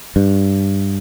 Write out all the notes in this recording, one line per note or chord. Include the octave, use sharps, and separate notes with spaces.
G2